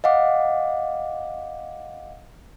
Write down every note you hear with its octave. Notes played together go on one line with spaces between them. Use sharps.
D#5 F5 F#5 D6